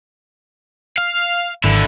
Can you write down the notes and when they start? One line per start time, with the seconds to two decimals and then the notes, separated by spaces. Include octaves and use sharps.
0.98 F5
1.64 G#1 D3 E4